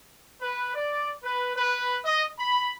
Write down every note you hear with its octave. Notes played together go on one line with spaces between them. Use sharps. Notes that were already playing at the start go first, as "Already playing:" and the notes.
B4
D5
B4
B4
D#5
B5